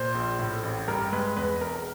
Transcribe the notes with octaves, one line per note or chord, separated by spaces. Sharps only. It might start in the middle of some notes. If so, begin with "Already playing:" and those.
Already playing: A#2 C5
A#1
A2
A1
G2 A#4
G#3 B4
E2 B4
E1 A#4
A#4